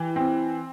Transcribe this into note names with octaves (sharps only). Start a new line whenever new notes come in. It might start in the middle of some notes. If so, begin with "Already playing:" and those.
Already playing: E3 G4
C4